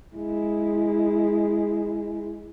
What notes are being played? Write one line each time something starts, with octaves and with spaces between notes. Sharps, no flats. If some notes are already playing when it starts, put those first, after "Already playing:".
G#3 E4